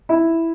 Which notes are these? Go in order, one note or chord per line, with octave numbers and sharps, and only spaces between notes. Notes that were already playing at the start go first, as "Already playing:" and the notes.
E4